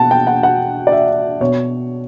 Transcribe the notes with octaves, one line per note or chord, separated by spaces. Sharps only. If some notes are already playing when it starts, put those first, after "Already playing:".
Already playing: B2 F#5 A5
G5
F#5
F#5
D5
E5
B2 C#5